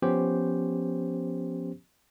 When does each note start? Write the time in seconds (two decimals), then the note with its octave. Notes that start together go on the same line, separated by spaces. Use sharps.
0.02 F3 B3 C#4 G4 C5